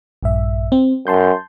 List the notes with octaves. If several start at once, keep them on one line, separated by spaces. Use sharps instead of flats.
A#1 G2 E5
C4
F#2 A5 C6 G6